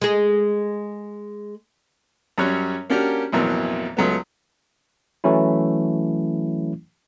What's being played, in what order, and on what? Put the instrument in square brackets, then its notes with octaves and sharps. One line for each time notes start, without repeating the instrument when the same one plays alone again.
[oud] G#3 G#4
[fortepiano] F#2 F#3 G3 C#4 C#5 F#6
A#3 C#4 D4 F#4 G4 A#4
A1 F2 B2 E3 F#3 A#3
C#2 F#3 A3 B3
[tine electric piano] E3 F#3 A3 C#4 E4